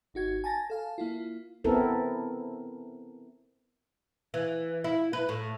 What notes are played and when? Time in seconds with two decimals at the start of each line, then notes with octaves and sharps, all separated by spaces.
0.14 G#1 D#4 F#4 G#6
0.44 G#5 A5 A6 A#6
0.70 A4 F5 A5
0.98 A#3 E4 F4
1.64 B3 C4 E4 A4 A#4
4.34 E3
4.84 E4
5.13 B4
5.29 A2